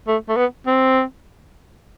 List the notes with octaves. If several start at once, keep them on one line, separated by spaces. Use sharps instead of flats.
A3
A3
B3
C4